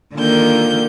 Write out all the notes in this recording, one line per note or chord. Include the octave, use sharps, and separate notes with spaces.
D3 D#3 A#3 F4 A#4 G6